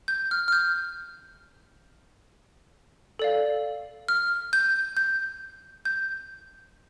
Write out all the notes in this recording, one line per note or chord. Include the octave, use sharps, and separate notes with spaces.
G6
F6
F6
G6
A4 D5 F5
F6
G6
G6
G6